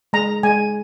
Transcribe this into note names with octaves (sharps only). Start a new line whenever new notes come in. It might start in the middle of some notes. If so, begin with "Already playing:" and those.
G#3 A#5
G#3 G#5